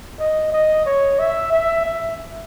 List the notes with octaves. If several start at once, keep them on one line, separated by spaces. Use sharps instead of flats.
D#5
D#5
C#5
E5
E5
E5